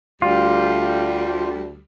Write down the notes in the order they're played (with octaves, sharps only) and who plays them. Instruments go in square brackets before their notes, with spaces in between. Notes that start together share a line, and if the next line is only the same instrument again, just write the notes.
[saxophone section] D2 G3 [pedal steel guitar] F4